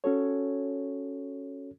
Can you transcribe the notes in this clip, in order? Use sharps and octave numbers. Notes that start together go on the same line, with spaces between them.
C#4 F#4 A4 C#5